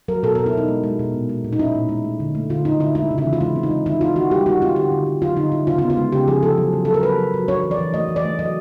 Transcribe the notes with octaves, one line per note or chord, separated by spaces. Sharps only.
F#3 A#4
B2 A4
A#4
B2
E4
B2 D#4
G#3
G#3
B2
A#2
G#3
A#2
D#4
C#4 E4
A#2
G#3
A3
D3
A3
D3 F4
A3 D#4
D3 E4
G#3 E4
C#3
E4
E3
F4
G#3 E4
C4
D#4
G#3
D#3 E4
D#4 F4
D#3 F#4
G3 G4
D#4 F#4
C4 F4
D3 G4
D3
D3
F#3 F4
D3 D#4
D3 E4
C#3 F4
F4
B3
F4
G#3
C#3 G4
F3 G#4
F3 A4
F#3
F#3
F#3 A4
A#4
F#3 B4
F#3
F#3
D4 C#5
E3
D5
E3
A3 D#5
E3
D5
A3
F#3 D#5